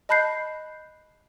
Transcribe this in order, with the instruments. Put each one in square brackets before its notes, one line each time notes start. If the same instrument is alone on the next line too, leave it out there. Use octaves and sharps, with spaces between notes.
[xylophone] D#5 A5 B5 F#6 G6 C7